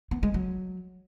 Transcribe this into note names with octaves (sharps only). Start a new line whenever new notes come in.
B3
G#3
F#3